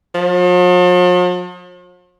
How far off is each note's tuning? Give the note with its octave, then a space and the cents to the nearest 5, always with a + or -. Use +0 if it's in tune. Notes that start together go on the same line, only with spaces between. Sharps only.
F3 +45